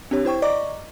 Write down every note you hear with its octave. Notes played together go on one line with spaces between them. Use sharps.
C4 D4 G4 C#5
E4 C5 G5 C#6
D5 D#5 A#5 C#6 D6